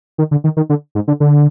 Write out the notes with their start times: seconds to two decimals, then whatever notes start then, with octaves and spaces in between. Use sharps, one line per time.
0.18 D#3
0.31 D3
0.44 D#3
0.57 D#3
0.69 D3
0.95 G#2
1.08 D3
1.20 D3